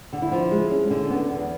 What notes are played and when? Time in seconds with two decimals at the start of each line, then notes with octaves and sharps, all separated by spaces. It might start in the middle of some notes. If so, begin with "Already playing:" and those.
0.13 D3
0.22 E4
0.32 F3
0.51 G#3
0.71 C#4
0.90 D3
1.10 B3
1.30 E2